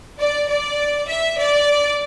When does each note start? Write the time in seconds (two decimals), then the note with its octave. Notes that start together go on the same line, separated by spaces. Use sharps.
0.20 D5
0.49 D5
1.09 E5
1.39 D5